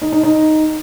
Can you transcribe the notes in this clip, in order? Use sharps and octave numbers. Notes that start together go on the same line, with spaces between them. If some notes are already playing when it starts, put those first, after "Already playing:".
D#4
D#4
D#4